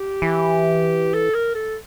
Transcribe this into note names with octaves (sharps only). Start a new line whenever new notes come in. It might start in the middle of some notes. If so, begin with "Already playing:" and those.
Already playing: G4
E3
A4
A#4
A4